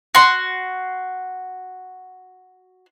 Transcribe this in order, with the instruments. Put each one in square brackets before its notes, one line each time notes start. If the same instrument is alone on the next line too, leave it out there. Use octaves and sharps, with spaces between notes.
[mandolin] F#4 C6